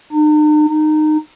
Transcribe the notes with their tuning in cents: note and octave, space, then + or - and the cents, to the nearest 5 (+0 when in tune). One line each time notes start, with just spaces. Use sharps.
D#4 -45
D#4 -20